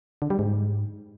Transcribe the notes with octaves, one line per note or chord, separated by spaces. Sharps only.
D3
G3
G#2